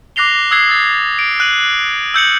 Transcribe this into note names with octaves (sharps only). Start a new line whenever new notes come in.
D6 F#6 A#6 C7 F7 G7
D#6 E6 F#6 G#6 C7
E6 A6
D7
F#6 D#7 F#7
E6 G6 C#7 F#7